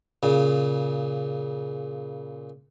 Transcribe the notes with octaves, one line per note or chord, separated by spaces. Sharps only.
A#2 C#3